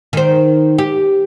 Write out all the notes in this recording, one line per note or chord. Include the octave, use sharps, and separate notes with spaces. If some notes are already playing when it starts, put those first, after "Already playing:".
D#3 C5
G4